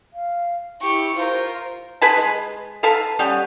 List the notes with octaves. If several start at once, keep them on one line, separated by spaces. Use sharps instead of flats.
F5
E4 G4 C#6
F4 A#4 C5
G#4 B4 C5 A5
G#3
A4 B4 F5 A5
G3 B3 C#4